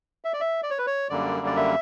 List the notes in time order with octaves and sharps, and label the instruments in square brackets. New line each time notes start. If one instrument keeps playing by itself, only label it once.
[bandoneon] E5
D5
E5
D5
C#5
B4
C#5
F#2 D3 G3 A#3 D5
D5
E5